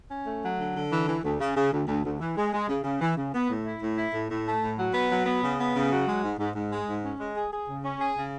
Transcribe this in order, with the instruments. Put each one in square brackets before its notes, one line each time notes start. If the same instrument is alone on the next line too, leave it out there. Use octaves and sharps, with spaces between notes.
[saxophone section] C#4
A3
F#3
D3
D3
E3
E3
D2
C#3
C#3
D2
D2
D2
E3
G#3
G#3
C#3
C#3
E3
C#3
B3
A2
E4
A2
E4
A2
A2
A3
A2
F#3
B3
F#3
B3
C#3
B3
C#3
F#3
G#3
G#2
G#2
G#2
G#3
G#2
C#4
G#3
G#4
G#4
C#3
C#4
G#4
C#3